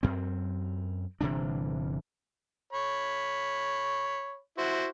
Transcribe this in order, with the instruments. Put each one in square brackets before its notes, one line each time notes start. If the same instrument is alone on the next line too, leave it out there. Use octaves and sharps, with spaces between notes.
[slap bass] F#2 C4
G1 C3 E3 D4
[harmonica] C#5 B5
E4 F#4 C5